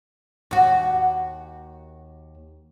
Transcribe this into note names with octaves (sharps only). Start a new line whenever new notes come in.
D#2 F#4